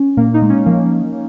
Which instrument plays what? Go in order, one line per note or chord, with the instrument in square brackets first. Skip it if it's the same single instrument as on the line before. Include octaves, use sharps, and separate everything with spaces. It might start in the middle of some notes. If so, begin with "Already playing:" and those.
Already playing: [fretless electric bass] C#4
[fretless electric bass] A#2 [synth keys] A#3
[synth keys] D#4
[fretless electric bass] G#3
[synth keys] C#4
[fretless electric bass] F3 [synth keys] A#3